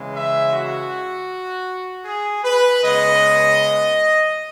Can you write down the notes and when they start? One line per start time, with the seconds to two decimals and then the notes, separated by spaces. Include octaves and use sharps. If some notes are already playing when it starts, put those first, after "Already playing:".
Already playing: C#3 E3 G#3
0.14 E5
0.52 F#4
2.05 G#4
2.43 B4
2.81 C#3 G#3 B3 D#5